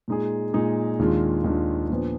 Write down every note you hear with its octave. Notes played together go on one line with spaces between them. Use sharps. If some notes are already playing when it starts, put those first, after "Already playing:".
A#2 G#3 D#4 G#4
A#2 G#3 D#4 G#4
D#2 D#3 G#3 D4 F4
D#2 D#3 G#3 D4 F4
A#2 F3 B3 D4